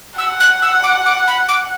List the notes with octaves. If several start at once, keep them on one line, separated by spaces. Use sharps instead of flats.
F#5 E6
F#6
E6
D6
D6
B5
D6